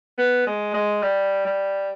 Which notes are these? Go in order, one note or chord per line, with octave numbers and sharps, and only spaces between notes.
B3
G#3
G#3
G3
G3